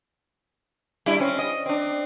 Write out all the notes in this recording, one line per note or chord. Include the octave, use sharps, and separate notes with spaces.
G3 D4 E4
C4 C#4
D#5
C4 D4